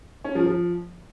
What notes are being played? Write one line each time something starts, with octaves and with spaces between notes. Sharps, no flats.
C#4
F3
F3